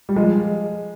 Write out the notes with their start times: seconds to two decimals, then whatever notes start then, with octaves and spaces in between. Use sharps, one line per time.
0.09 G3
0.16 F3 G#3